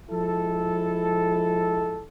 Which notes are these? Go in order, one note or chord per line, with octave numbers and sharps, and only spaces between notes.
F3 G#3 E4 A4